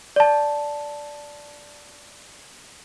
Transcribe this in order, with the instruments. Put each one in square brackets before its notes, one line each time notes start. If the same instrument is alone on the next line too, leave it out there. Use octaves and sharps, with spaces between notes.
[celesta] D5 A5